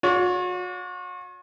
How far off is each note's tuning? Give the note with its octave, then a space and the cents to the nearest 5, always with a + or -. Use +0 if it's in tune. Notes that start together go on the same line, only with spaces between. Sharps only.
F#4 -40 C#5 +40